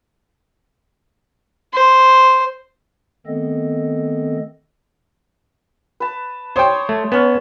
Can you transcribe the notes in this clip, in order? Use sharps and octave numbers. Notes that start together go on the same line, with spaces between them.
C5
D#3 A3 B3 C4 A4 D#5
B4 A5
C5 C#5 G5 C6 D#6
A3
B3 C#4 A5